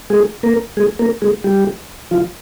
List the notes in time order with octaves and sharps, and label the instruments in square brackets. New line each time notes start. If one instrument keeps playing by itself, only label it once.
[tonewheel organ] G#3 G#4
A#3 A#4
G#3 G#4
A#3 A#4
G#3 G#4
G3 G4
F3 F4